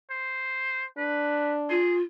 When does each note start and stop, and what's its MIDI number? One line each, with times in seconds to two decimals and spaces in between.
0.10 0.86 72
0.97 1.79 62
0.97 1.55 71
1.70 2.02 65
1.70 1.94 68